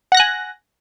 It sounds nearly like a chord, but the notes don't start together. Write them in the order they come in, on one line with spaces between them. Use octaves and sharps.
F#5 A#6 F#6 G#5